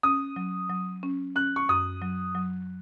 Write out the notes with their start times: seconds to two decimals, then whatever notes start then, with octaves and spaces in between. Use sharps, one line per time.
0.03 C#4 D#6
0.36 F#3
0.70 F#3
1.03 C#4
1.35 C#4 F#6
1.56 C#6
1.69 F#2 D#6
2.02 F#3
2.35 F#3